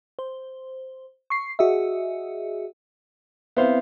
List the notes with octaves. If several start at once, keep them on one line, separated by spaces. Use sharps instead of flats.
C5
C#6 C7
F#4 G#4 D#5 E5
B3 C4 E4 C5 E5 F5